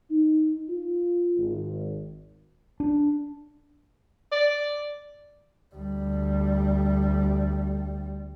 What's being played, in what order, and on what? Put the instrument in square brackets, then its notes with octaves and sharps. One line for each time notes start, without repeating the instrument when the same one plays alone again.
[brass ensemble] D#4
F4
G#1
[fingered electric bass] D4
[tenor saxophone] D5
[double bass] D2 G3